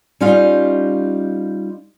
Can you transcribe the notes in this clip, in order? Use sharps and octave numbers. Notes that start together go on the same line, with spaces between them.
G3 C#4 D#4 F4 D#5 F5